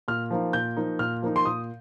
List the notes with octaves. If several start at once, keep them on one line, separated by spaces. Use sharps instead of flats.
A#2 F6
F3 A#3 D#4
A#2 G6
F3 A#3 D#4
A#2 F6
F3 A#3 D#4
C6
A#2 D#6